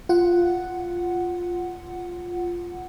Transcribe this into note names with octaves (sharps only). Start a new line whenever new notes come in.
F4 F#5